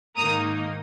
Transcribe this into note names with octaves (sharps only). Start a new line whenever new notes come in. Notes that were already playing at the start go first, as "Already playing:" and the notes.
G#2 D#3 A#3 D#4 A#5 D#6